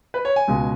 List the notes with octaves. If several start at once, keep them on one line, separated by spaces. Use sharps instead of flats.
B4
C#5
G#5
C#2 B2 G#3